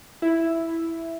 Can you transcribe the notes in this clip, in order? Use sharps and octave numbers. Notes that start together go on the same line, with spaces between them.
E4